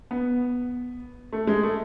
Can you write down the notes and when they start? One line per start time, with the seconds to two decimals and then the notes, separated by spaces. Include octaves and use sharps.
0.11 B3
1.33 A3
1.47 G#3
1.63 A3